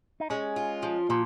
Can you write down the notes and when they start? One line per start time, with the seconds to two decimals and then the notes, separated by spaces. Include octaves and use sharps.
0.20 D#4
0.30 G#3 C#4
0.56 F4
0.83 F3
1.09 A#2 F3